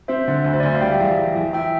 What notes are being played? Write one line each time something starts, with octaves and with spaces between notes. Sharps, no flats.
C4 C5 E5
D3
D2
C5
D5
D2 E5
F5
G3 E5 G5
E2
E2
E2
E3 E5 G5